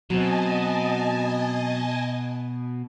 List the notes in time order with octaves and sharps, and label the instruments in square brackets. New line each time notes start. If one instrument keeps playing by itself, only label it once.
[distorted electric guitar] B2 [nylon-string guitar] F#3 C4 [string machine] D#5 G#5 A5